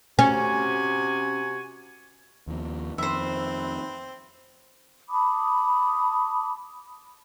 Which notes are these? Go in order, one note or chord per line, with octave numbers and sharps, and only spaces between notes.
C3 C#4 F#4 G#5
D#2 F3
F2 D#3 C4 B4 C5 E5
A5 B5 D6 D#6